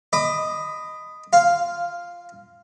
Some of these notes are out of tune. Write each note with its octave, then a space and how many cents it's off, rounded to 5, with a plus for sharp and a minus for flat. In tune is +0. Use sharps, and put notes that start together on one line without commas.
D#5 +0 B5 +15 D6 +35
F4 -10 F5 +0